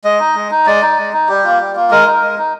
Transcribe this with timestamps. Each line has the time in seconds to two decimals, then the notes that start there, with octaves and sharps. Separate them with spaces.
0.04 G#3 D#5
0.19 D#4
0.35 G#3
0.51 D#4
0.66 G#3 D5
0.82 D#4
0.98 G#3
1.13 D#4
1.28 G3 G4
1.44 A#3 F4
1.60 G3
1.76 A#3 F4
1.91 G#3 A#4
2.07 D#4
2.22 G#3
2.38 D#4